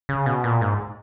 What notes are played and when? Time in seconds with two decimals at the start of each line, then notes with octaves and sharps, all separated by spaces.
0.09 C#3
0.26 B2
0.44 A#2
0.61 G#2